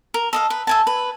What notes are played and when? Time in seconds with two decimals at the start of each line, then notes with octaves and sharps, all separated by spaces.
0.14 A#4
0.33 A4 D#5 F5
0.50 B4
0.67 E5 G#5 A5
0.87 B4